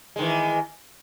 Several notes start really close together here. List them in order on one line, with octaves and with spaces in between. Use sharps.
G#3 D#3 E3